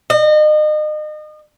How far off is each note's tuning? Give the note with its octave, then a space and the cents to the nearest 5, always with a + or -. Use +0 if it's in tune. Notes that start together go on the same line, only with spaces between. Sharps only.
D#5 -35